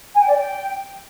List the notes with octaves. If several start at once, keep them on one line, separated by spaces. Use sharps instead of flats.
G#5
G5
D5
G5